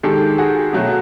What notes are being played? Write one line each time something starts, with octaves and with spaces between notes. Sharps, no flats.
D#3 G#3 G4 A4
F#4 G#4
B2 F#3 A3